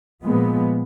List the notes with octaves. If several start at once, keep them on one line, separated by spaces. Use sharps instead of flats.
A#2 F3 G#3 B3